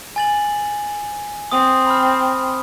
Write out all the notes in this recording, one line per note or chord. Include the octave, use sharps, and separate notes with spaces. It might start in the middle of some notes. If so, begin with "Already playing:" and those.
G#5 A6 F#7
C4 D#6
B5 F6